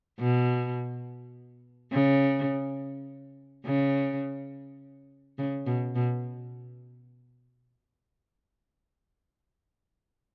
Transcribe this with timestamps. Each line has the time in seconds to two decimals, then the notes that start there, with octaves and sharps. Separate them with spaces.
0.19 B2
1.92 C#3
3.65 C#3
5.38 C#3
5.66 B2
5.95 B2